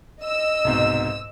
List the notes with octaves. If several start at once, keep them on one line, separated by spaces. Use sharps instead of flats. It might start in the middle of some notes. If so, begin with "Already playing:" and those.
D#5 E6
C2 G#2 B2